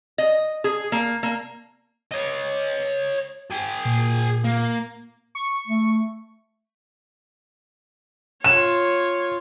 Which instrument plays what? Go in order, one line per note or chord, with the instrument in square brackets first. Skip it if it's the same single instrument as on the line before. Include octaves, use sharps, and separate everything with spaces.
[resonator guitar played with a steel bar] D#5
G#4
A#3
A#3
[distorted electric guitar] C#5 D#5
G#4 G5
[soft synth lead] A#2
[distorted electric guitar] A#3
[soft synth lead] C#6
[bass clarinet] A3
[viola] F4 C#5 [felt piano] E7